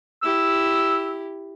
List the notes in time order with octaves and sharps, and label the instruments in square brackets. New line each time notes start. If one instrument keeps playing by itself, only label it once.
[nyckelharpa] E4 G4 [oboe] E6